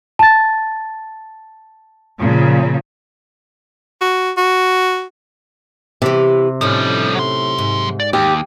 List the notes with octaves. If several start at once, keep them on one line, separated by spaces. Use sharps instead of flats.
A5 A6
A#2 C#3 F3
F#4
F#4
C3 E3 G4
A2 F3 G3 C#4 D#4
F#3 C6
G#2
D5
D#2 G4